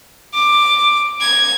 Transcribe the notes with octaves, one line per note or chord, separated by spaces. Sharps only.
D6
G#6